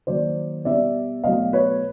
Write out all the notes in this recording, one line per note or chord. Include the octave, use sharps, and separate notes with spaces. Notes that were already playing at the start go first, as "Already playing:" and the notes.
D#3 F#3 A#3 C5 D5
B2 G3 B3 D5 E5
B2 F#3 A3 D#5 F5
B4 C#5